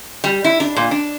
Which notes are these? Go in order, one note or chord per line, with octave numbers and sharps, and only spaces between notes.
G3
E4
D4
A#2
D4